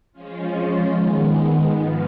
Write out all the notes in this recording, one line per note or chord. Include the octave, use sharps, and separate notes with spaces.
F3 G#3 C#4 F4
D#3 G#3 B3
G#2 F3 B3 F4